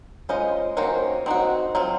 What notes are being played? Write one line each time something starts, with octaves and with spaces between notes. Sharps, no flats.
G#3 C#4 F4 C5 D#5
D#3 A#3 C#4 F#4 C5
C4 D#4 F#4
F#3 C4 F4